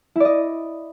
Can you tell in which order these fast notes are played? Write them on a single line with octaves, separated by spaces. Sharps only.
E4 D5 D#5